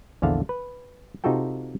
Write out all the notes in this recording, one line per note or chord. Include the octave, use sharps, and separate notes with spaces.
A#1 E2 D3 F5 A5
B4
C3 D#4 F4 F#4 A4 G5